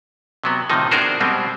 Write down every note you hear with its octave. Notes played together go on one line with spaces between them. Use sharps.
C3 F#3 B3
A2 C3 D#3 F3 D#4
B3 D4 F#4 G#4 A#4 C5
B2 G3 G#3 C4